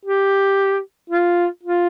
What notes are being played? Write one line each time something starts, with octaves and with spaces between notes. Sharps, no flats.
G4
F4
F4